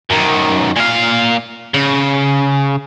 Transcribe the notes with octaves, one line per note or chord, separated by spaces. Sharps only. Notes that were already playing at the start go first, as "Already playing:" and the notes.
F#2 D#3
A#2 F5
C#3